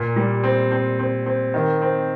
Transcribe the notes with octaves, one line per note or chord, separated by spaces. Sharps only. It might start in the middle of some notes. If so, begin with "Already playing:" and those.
Already playing: A#2
G3
C4
C4
C4
C4
D#3
C4